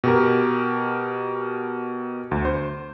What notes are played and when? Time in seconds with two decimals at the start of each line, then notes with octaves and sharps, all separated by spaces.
0.04 B2 G4 A#4
2.31 D2
2.45 C5